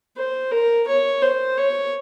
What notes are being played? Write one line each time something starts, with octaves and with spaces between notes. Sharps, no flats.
C5
A#4
C#5
C5
C#5